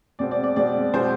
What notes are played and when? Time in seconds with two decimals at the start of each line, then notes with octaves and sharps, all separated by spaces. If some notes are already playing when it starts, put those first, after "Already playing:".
0.19 B2 G#3 C4 D5
0.31 D5
0.44 D5
0.56 B2 G#3 C4 D5
0.94 B2 G#3 C4 C5